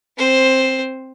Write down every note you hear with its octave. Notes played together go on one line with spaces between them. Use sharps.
C4 C5